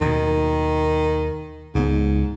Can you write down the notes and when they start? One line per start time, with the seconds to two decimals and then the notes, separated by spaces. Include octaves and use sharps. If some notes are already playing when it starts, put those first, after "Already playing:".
0.01 D#2 B2 D#3
1.75 C#2 G#2 G#3 B3